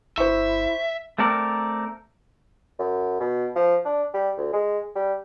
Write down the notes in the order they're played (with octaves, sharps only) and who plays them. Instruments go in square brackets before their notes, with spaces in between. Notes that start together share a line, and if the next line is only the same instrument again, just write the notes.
[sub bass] G1 [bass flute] E4 [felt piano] C5 C#6 [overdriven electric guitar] E5
[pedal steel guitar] A3 C4 A4 A#4 D5
[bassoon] F#2
B2
F3
D4
G3
D2
G#3
G3